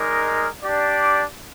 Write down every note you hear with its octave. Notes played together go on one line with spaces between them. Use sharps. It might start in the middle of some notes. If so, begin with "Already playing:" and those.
Already playing: G#3 D#4 A#4 D5
D4 G4 D5